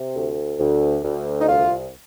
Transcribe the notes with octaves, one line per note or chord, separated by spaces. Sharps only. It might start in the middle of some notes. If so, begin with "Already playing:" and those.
Already playing: C3
D2
D2
D2
D#4
C2 F4